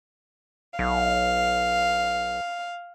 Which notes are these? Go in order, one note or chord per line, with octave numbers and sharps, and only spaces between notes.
B1 F5